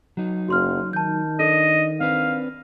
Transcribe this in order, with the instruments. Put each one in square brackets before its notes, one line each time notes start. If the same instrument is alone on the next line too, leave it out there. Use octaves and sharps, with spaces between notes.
[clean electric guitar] F#3 D#4
[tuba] F#1 [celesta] F#4 C6 F6
[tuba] D#3 [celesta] A5 G6
[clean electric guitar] D4 [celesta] A4 [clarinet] D#5
[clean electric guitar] C4 D4 B4 [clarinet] F5